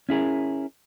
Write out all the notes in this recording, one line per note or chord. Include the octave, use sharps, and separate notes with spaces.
C#4 E4 G#4 A#4